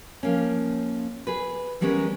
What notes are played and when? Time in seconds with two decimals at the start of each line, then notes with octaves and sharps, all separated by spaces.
0.23 F3 A#3 C#4
1.27 G#4 B4
1.81 E3 G3 G#3 B3 C#4 A#4